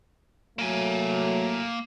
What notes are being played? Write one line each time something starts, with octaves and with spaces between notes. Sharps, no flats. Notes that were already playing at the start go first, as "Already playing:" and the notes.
F#3 A3 A#3 G#5